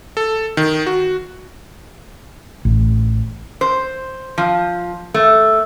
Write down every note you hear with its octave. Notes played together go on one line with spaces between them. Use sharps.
A4
D#3
F#4
A1
C5
F3
A3